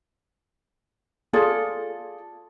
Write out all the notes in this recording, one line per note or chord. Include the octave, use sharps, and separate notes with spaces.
F4 G#4 A4 D5